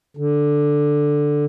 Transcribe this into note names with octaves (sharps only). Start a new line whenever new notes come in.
D3